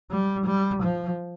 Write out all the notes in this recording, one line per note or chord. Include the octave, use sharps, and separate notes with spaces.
G3
G3
F3